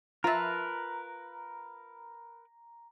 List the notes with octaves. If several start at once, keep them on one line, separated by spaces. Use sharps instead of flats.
F3 F4 A#4 B4 E5 A5 A#5